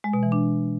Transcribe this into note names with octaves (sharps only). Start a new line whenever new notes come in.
G#3
B2
E3
D4